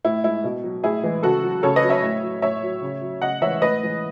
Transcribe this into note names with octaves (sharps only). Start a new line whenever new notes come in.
A2 E4
G#3 E4
B2
F#3
A2 E4 G#4
E3 G#3
C#3 F#4 A4
F#3
C#3 A4 C#5
B4 D#5
F#3
C#5 E5
A2
F#3
A2 C#5 E5
F#3
C#3
F#3
C#3 D#5 F#5
E3 G#3 C#5 E5
A2 B4 D#5
E3 G#3